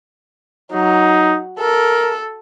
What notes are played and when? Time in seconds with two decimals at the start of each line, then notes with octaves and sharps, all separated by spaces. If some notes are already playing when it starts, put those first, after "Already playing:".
0.72 F#3 D#4
1.59 A4 A#4